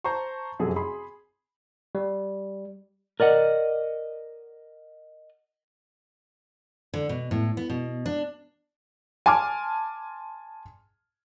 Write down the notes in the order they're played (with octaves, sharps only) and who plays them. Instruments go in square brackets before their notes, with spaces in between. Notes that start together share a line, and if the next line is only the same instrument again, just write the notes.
[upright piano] C5 A5 A#5 C6 C#6
F1 F#2 C3 F#3 G#4 A4
G#4 B5 C6
[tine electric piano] G3
[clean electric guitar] A#4 D5 D#5 F#5
[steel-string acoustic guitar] D3
B2
A2
B3
B2
D4
[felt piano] G#5 A5 C6 D6 F6